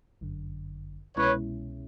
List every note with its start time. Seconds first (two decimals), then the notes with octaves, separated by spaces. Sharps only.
0.21 G1 F#2 D3
1.16 C2 B2 G#3 C#4 E4 B4 C#5